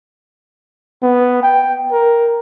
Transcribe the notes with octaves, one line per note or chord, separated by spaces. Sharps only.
B3
G5
A#4